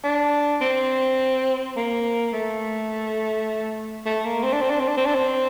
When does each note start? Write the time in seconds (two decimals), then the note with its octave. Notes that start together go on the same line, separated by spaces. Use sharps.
0.04 D4
0.61 C4
1.77 A#3
2.33 A3
4.06 A3
4.25 A#3
4.43 C4
4.53 D4
4.62 C4
4.70 D4
4.80 C4
4.88 D4
4.97 C4
5.06 D4
5.15 C4